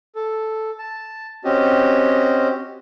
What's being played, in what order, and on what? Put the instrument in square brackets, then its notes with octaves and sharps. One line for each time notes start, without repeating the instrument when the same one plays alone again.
[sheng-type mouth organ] A4
A5
C4 C#4 F#4 G4 D#5